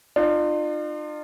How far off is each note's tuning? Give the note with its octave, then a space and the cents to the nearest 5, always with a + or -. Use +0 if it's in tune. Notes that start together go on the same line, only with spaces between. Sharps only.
D4 +45 F4 +0